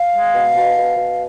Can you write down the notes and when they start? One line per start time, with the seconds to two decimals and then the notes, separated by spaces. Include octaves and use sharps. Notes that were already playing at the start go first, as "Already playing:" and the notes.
Already playing: F5
0.14 G#3
0.33 B2
0.54 B2
0.75 B2
0.96 B2